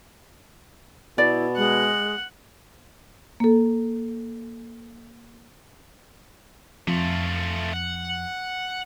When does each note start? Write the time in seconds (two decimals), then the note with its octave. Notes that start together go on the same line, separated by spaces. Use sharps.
1.18 B2 E4 D5
1.57 G#3 F#5
3.40 A#3 A4
6.88 F2 A3 F4
7.73 F#5